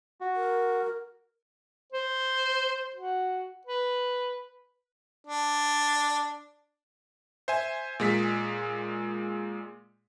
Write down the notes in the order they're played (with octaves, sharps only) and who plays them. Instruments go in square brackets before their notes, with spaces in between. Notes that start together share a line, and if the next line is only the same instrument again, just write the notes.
[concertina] F#4
[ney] A#4
[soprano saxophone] C5
F#4
B4
[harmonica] D4
[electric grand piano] C5 E5 G#5
A#2 G#3 B6